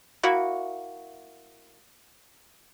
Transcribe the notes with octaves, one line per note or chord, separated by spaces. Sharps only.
A#3 E4 F#4